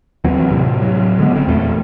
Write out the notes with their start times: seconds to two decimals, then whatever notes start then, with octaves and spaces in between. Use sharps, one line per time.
0.24 D#2 E3 F#3 C4
0.51 A2 C3
0.81 A2 F#3
1.19 D3 G#3 B3
1.32 G#1 C4
1.45 D#1 E2 F#3 A3